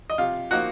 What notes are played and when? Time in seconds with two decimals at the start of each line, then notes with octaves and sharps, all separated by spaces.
0.10 D#5
0.18 C3 F4 F5
0.51 F3 A#3 D#4 F#4 F#5